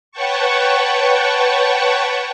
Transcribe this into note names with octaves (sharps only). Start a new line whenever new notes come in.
B4 C#5 F#5 G5 A5 C#6